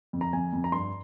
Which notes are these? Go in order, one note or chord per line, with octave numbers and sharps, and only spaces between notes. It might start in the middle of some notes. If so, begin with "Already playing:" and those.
F2
A#5
F2 G#5
F2
A#5
G2 C6